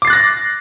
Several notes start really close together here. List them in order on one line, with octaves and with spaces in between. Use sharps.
D6 C7 A6 F#6 A#6